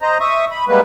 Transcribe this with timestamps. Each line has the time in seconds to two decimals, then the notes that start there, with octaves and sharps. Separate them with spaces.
0.02 C5 D#5 A#5
0.20 E5 C#6 D#6
0.51 B5
0.68 G3 G#3 A#3 B3 B4